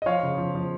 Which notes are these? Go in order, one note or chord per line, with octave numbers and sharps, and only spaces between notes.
D#5
F3 C#5 F5
C#3
F3
F3